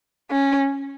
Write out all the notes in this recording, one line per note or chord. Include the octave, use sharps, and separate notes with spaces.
C#4